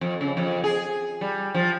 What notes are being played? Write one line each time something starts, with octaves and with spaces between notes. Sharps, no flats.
F2
C#3
F2
G#4
G3
F3